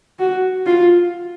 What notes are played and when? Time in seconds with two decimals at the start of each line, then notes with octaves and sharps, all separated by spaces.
0.19 F#4
0.66 F4